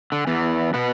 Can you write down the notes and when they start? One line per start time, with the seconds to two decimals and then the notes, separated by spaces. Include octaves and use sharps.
0.12 D3
0.27 E2 E3
0.74 B2 B3